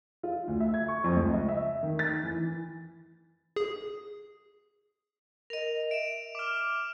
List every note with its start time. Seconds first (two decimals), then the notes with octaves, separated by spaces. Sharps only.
0.23 F4
0.48 D2
0.60 E5
0.74 G#6
0.88 C#6
1.04 F2
1.16 C#2
1.33 D#5
1.48 E5
1.83 D#3
1.99 A6
2.23 E3
3.56 G#4
5.50 A#4 D#5 F7
5.91 E5 D7 E7
6.35 D6 F6